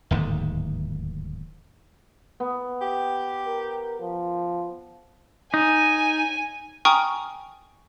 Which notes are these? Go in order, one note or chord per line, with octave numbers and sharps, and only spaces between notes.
D1 D#2 G#2
B3
G4
A#4
F3
D#4 G#5
G5 G#5 A#5 C#6 D#6 F6